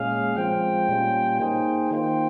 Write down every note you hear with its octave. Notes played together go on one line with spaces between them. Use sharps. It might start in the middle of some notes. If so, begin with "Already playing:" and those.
Already playing: A#2 G#3 C#4 G#4 F5
F3 G#3 C4 F4 G5
A#2 G3 C#4 F4
A#3 D#4 G#4 C5 G5
D#3 A#3 F4 C5 G5